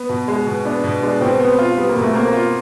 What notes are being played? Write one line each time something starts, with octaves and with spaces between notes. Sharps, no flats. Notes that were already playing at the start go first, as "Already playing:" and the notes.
Already playing: B3
B2
G#3
B2
B3 D4
B2
G#3 D4
B2 C4
B3 C4
F4
G3 B3
A#3
B2
A3
A#3 C4
F4